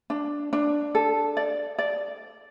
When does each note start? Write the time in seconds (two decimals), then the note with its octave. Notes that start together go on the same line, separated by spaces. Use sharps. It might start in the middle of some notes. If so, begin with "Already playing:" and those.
0.10 D4
0.53 D4
0.95 A4
1.37 D5
1.78 D5